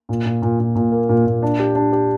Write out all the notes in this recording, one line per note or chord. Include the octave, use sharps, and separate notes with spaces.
A#2
A#2
A#2
A#2
A#2
A#3
A#2
A#2
D4
G4
D4
G4